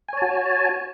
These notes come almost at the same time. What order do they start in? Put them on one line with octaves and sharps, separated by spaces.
G#5 C#5 A5 F#4